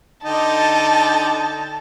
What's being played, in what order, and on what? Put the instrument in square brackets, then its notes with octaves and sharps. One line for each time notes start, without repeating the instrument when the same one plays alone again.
[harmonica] D3 D#4 G5 [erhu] A5